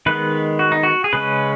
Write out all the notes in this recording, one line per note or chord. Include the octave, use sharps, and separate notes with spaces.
D#3 G#3 B3 B4
F#4
D#4
F#4
G#4
C#3 G#3 C#4 B4